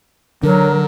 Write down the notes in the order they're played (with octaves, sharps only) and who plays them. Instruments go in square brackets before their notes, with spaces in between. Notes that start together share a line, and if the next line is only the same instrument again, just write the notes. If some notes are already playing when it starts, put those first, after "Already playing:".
[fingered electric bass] D3 [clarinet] F#3 [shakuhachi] A#4